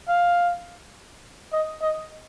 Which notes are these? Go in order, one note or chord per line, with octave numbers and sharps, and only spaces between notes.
F5
D#5
D#5